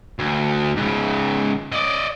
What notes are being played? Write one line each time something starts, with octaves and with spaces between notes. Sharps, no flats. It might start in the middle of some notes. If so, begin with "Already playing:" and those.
D2
G#2 C#3
D5 D#5